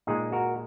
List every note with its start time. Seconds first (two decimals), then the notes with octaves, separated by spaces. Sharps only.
0.07 A#2 G#3 D#4 G#4
0.32 F#4 A#4